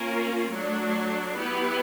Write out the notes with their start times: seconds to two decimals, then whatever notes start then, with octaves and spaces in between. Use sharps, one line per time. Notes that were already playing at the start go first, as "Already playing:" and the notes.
Already playing: A#3 C#4 F4 A#4
0.51 F#3 A3 D4
1.37 F#3 B3 E4 G4 B4